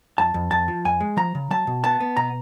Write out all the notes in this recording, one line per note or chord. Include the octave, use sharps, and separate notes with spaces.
F2 A5
F2
F2 A5
F3
F2 G#5
G#3
F3 A#5
C#3
F#3 A5
B2
B3 A5
B3
B2 A#5